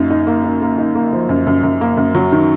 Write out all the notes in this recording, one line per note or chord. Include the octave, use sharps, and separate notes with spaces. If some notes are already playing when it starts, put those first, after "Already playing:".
Already playing: F#2 A#3 D#4
D#4
A#3
D#4
A#3
D#4
A#3
F3
F#2
F#2
F#2
A#3
F#2
F#3
D#3